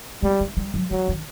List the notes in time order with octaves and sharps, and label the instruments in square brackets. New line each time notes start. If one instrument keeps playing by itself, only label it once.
[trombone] G3 [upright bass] B3
[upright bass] A3
G3
F#3
[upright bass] E3 [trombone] F#3
[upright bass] D#3